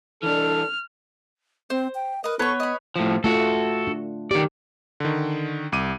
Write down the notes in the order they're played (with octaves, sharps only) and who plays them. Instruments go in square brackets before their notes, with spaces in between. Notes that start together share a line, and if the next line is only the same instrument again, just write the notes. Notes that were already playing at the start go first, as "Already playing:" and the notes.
[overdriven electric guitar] E3 D4 [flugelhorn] A4 [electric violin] F6
[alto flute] C4 [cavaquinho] C5
[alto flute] G5
[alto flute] A#4 [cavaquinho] B4 D#5
[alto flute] B3 [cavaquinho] A4 C#6 [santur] B4 C#5
[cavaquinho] D#5 B5
[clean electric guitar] A2 F3
[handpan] A3 F4 F#5 [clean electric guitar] F#4 A4
[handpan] D4
[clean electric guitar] D#3 D5 [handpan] G4
[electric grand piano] D3 D#3
C2 D6 D#7